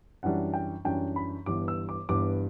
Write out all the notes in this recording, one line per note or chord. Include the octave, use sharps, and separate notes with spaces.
F#2 E3 G3 D4 F#5
G5
F#2 E3 G3 D4 G5
B5
G1 G2 E3 B3 D6
E6
D6
G1 G2 E3 B3 D6